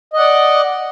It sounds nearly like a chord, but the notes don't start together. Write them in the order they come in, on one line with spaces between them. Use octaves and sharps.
D#5 F#5 D5